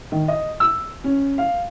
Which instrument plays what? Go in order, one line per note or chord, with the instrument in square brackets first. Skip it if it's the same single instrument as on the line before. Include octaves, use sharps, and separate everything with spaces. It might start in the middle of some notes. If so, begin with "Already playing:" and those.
[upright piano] D#3
D#5
E6
C#4
F5